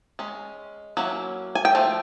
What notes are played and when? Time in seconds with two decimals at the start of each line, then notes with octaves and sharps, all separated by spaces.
0.19 G#3 C#4
0.97 F#3 A#3 C#4 E4
1.55 G#5
1.65 G5
1.75 F3 A3